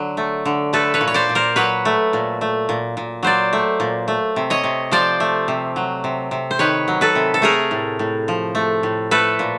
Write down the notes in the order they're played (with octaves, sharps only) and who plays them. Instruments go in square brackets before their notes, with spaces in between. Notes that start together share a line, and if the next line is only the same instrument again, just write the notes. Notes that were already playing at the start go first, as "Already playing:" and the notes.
Already playing: [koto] D3 F#3
A3
D3
A3 A4 B4
B4 C#5
A#2
C#5
C5 D5
A#2
A#4 C5
F#3 B4 C#5
A3
A#2
A3
A#2
A#2
F#3 C5 D5
A3
A#2
A3
C3
C#5 D#5
C3
F3 C5 D5
A3
C3
F#3
C3
C3
C5
D#3 B4 C#5
F#3
A4 B4
C3
A4
A3 G#4 A#4
A2
A2
F3
A3
A2
A3 A4 B4
A#2